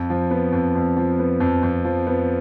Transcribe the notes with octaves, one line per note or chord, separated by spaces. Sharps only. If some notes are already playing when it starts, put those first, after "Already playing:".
Already playing: F2
F3
B3
F2
F2
F3
B3
F2
F2
F3
B3